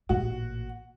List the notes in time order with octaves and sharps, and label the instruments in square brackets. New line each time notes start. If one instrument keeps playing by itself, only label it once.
[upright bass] A1 A#2 [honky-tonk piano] F#4